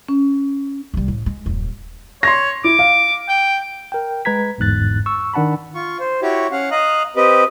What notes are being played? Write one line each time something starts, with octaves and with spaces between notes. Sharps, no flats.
C#4
C2 G3
A2
G#3
D#1 F#2
C#5 C6 A#6
E4 D6
F5
G5
A#4 G5
G#3 B4 A#5 G#6 B6
G1 E2 G#2 F#6 A6
C#6 E6
D#3 D4 F#5 A5 B5
F4 C#6
C5
E4 F#4 G4 C#5
C#4 F5 F#5
D#5 F5 A#5 F#6
C4 G4 B4 D#5